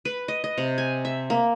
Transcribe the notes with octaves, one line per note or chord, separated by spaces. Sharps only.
B4
D#5
D#5
C3
G#5
E5
A#3